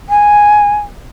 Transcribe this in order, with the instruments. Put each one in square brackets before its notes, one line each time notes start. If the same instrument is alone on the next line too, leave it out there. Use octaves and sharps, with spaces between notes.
[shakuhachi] G#5